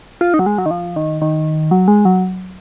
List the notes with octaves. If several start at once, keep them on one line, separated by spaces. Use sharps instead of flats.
F4
D#4
F#3
G#3
F#3
D#3
F3
D#3
D#3
F#3
G#3
F#3